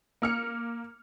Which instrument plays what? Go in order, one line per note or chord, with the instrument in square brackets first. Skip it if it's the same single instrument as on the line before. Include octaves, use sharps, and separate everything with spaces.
[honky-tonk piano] A#3 F6 C#7